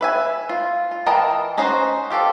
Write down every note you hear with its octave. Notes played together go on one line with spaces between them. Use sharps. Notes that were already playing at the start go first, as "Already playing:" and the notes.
B4 E5 G#5
F4
F4
E3 A#4 D#5 G5 A5
C#4 D#4 F#4 C5
F4 G4 A4 C5